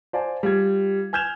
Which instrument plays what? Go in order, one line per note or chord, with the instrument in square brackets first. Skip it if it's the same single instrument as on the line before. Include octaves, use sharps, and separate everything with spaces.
[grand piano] C5 D5 F5 G#5 A5
G3 F4 G#6
G#5 F6 G6 G#6 E7 F7